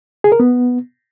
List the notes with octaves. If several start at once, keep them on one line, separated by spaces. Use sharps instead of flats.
G#4
A#4
B3